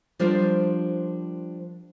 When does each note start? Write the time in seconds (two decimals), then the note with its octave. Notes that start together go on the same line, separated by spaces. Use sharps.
0.19 F3 G3 D4 F4 A#4 C5